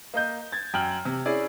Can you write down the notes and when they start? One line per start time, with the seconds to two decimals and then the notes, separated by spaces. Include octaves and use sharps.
0.14 A#3 D#5 G6
0.52 G#6 A6
0.73 F#2 G5 F6 F#7
1.05 C3
1.26 C#4 E4 G#4 D5